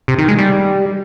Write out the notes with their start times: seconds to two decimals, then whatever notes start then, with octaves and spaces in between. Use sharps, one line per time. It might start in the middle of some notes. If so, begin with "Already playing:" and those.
0.08 C3
0.18 D#3
0.28 G#3
0.38 G3